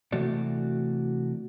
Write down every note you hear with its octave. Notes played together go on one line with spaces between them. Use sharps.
C3 E3 A3 F#4 D5